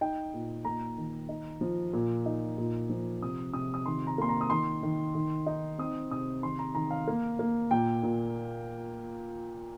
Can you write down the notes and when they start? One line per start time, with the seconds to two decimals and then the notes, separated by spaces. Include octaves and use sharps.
0.01 D#4 G5
0.34 A#2
0.65 A#3 A#5
0.98 D#3
1.29 D#4
1.61 F3
1.93 A#2
2.26 D#4
2.58 A#2
2.90 F3
3.22 C3 D#6
3.54 C3 D#6
3.74 D#6
3.86 D#3 C6
4.07 A#5
4.18 A#3 C6
4.29 A#5
4.41 D#6
4.50 D#3 C6
4.83 D#3
5.15 D#3
5.46 D#4
5.78 C4 D#6
6.11 C3 D#6
6.43 D#3 C6
6.59 A#5
6.75 D#3 A#5
6.91 F5
7.08 A#3
7.39 A#3
7.71 A#2 G5
8.03 A#2